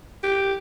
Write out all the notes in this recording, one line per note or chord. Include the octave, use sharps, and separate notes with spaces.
G4